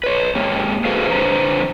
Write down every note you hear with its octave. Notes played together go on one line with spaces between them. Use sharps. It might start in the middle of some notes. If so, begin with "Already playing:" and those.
B4 C#5
G#2 A#3 G4
F#4 G#4 A4 B4 C5 F5
F2 D3 B4 C5 A#5